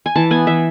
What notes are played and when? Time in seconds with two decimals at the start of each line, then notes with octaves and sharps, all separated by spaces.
0.06 G#5
0.15 E3 A5
0.30 B3 G#5
0.47 E3 E5